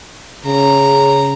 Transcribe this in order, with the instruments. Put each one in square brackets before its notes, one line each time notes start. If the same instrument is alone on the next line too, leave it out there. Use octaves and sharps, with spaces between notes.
[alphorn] C#3 [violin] A#5